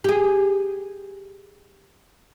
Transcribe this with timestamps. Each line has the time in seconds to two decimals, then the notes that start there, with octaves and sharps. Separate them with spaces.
0.04 G4 G#4